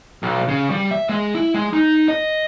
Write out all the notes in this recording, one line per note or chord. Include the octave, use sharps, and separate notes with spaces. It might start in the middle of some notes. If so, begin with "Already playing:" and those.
B1
C#3
G3
E5
G#3
E4
G#3
D#4
D#5